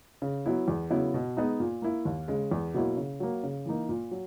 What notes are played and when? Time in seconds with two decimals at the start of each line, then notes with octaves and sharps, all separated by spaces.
0.22 C#3
0.46 F#3 B3 E4
0.68 E2
0.90 C#3 F#3 B3 E4
1.14 B2
1.37 G#3 B3 D#4
1.60 A#2
1.82 A#3 E4
2.05 D#2
2.28 C#3 G#3
2.51 E2
2.74 B2 F#3 A#3 E4
2.97 C#3
3.20 F#3 A#3
3.43 C#3
3.65 E3 A#3 D#4
3.89 A#2
4.11 F#3